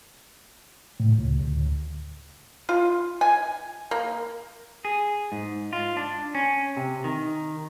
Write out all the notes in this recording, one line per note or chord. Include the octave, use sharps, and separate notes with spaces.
A2
C#2
D2
F4
G#5
A#3
G#4
G#2
F4
D4
C#4
C3
D#3